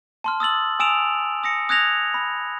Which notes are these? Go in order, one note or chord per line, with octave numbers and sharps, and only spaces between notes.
A5 C6 F6
D#6 E6 A6 F#7
G#5 D#6 E6 D7 E7 F7
D#6 A#6 C#7
D#6 F#6 G#6 A#6 F7
B5